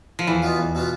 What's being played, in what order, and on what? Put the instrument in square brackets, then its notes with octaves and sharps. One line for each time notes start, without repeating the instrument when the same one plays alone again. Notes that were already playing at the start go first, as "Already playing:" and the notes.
[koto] F3
[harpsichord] E2 [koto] E3
[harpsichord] B2 B3 F4
E2
B2 B3 F4